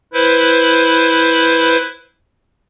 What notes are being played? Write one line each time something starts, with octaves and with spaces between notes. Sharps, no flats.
E4 B4 C5